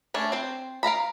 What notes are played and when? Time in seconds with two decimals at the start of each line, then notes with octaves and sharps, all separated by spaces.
0.14 A3 C#4 D4
0.32 C4 C5
0.83 A#4 F5 A#5 B5